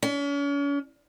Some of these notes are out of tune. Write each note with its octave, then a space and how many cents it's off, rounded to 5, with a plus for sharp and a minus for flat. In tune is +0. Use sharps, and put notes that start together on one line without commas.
C#4 +40